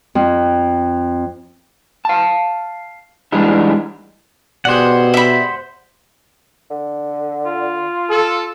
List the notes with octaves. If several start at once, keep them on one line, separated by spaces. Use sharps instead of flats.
F2
F5 A5
E3 G3 G#3 D4 D#4
B2 D4 G4 G#4 C5 F#5
E5 B5
D3
F4
A4